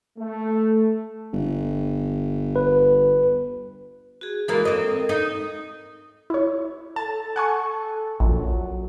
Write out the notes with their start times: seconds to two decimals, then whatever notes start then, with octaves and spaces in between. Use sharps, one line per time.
0.18 A3
1.33 G1
2.56 B4
4.21 F#4 G#4
4.48 E3 G#3 A#3 A4 A#4
4.65 C4 D#5
5.09 D#4
6.30 E4 C#5
6.96 A4 A5
7.36 F#5 G#5 C#6
8.20 A#1 F#2 A#2 F#3